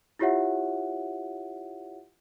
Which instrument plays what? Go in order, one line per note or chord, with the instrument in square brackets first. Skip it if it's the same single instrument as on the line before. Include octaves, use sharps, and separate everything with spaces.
[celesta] E4 F4 G4 C#5 E5 F#5